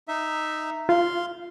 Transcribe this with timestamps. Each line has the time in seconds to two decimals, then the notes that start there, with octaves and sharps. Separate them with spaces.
0.08 D#4 E5
0.89 F4 F5 C6